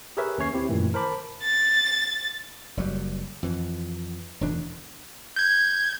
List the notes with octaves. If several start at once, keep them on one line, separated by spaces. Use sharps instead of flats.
G4 G#4 A#4 B4 C#5 E5
D#2 C#4 C#5 C7
C4 E4 G4
F#2 A#2 D#3 E3 A3
A#4 C5 A5 B5 D6
A6
F#1 F#3 G3
F2 E3
E1 D2 E3 D4
G6 G#6